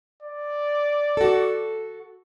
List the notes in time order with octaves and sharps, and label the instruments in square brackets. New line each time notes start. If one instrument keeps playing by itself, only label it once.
[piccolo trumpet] D5
[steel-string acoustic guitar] F#4 A4